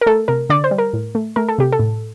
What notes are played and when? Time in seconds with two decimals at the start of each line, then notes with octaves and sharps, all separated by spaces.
0.01 A#4
0.06 A3 A4
0.28 C3 A#4
0.49 D3 D5
0.64 C5
0.71 G3
0.78 A#4
0.93 A2
1.15 A3
1.36 A3 A#4
1.49 A4
1.58 C3 G4
1.72 A4
1.79 A2